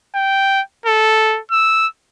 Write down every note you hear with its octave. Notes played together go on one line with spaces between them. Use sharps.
G5
A4
E6